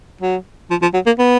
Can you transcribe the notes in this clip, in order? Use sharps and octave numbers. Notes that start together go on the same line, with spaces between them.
F#3
F3
F3
F#3
A#3
B3